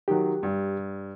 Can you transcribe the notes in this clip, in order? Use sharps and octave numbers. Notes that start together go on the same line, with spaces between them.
D#3 F#3 G4
G2